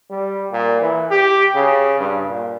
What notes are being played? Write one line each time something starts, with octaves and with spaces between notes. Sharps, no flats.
G3
A#2
E3
G4
C#3
G2
A#2